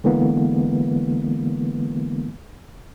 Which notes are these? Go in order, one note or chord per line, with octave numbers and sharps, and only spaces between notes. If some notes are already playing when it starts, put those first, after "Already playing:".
D3 E3 G#3 A#3 B3